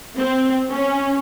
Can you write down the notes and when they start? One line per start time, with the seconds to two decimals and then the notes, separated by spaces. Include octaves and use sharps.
0.19 C4
0.71 C#4